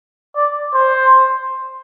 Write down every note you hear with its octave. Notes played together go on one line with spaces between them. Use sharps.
D5
C5